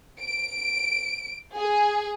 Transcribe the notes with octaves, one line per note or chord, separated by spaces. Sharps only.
D7
G#4